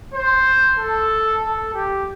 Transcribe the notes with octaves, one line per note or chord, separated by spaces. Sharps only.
C5
A4
A4
G4